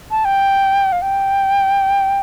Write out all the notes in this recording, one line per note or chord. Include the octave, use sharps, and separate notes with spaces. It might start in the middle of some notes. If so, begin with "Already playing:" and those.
A5
G5
F5
G5